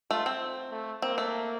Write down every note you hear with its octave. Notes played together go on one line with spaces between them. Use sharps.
A3 F4
C4
A3
A#3 C4
A3